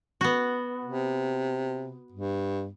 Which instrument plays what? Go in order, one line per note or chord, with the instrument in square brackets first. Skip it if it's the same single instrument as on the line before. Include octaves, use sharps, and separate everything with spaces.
[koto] B3 F#4
[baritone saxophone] C3
G2